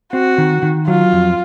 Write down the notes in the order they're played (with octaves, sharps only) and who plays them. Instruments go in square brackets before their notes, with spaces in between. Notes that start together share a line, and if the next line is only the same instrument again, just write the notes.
[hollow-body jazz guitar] C4 [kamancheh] F#4
[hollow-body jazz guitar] D#3
D#3
[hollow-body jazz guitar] F#3 [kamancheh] F4
[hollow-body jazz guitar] F2